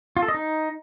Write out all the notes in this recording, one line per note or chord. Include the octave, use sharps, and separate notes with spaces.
F4
A4
D#5
D#4